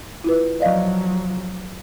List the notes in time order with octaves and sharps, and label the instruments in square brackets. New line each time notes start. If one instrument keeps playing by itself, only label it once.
[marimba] E4 F4 B4
[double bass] F3 F#3 [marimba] D5 D#5 F5